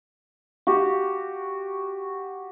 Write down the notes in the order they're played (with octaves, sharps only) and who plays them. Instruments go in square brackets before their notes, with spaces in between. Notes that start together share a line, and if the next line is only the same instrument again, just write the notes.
[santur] F#4 G4